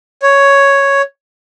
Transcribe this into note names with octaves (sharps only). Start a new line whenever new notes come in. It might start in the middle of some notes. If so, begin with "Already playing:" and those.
C#5